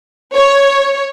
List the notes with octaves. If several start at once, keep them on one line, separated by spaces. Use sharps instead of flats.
C#5